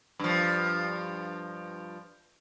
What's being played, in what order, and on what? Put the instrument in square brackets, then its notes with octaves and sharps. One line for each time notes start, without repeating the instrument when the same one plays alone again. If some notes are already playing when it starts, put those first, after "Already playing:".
[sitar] G2 F3